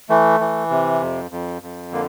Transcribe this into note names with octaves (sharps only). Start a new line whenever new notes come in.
E3 A3
E3
C3
F2
F2
F2
D3 A#3